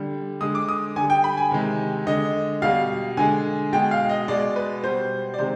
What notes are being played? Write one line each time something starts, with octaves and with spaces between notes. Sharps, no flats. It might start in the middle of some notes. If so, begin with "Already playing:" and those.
Already playing: D3 G3
D3 G#3 D#6
D6
D#6
D3 G3 G#5
G5
B5
G#5
C3 D#3 G#3
D3 G#3 D#5
B2 G3 F5
D3 G#3 G#5
B2 G#3 G5
F5
D#5
B2 G#3 D5
B4
B2 G3 C5
D5
C3 D#3 G#3 C5